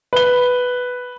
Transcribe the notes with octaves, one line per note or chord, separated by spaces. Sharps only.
B4 G7